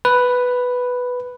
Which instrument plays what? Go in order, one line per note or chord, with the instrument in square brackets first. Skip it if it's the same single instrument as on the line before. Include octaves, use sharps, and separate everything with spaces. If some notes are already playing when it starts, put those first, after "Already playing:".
[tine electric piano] B4